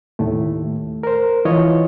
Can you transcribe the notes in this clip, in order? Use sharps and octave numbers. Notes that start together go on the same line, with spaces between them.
D#2 A2 A3
A#4 C5
E3 F4 C#5 D#5